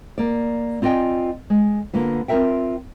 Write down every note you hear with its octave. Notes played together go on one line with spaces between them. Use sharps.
A#3 D5
C4 F4 D5 D#5 G5 G#5
G#3
D3 A#3 B3 F4
C4 F4 A4 A#4 E5 G5